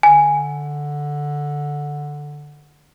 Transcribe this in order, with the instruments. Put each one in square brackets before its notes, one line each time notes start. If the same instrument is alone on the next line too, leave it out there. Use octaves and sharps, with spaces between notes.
[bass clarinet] D3 [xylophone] G#5